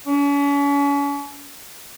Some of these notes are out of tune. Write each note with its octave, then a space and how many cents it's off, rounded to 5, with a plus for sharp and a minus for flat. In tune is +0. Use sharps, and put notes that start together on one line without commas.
C#4 +40